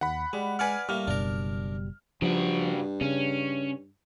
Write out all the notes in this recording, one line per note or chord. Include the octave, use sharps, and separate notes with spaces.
D#2 F#5 B5
G3 G#3
B4 D5 F#5 G#5 F6
A2 G3 A#3 F6
F#1 B2 D4 A#4
G2 C#3 F3 F#4
C#3 C#4